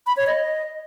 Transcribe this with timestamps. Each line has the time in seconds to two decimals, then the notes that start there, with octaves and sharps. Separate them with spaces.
0.07 B5
0.17 C#5
0.27 D#5